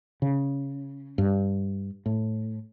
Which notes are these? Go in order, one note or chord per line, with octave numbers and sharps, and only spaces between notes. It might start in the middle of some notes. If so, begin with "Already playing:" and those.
C#3
G2
A2